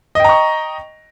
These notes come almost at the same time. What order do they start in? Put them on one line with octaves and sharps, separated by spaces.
D#5 G5 A#5 C#6